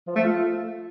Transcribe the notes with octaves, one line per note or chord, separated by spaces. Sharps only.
F3
A3
F4